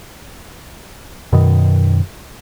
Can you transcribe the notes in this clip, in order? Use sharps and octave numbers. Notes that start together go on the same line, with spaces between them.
F#2 B2 D#3